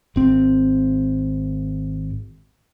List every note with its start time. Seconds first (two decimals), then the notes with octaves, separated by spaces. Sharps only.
0.16 G#1 C4